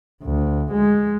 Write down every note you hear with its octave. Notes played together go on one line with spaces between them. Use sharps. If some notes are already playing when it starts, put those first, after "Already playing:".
D2
G#3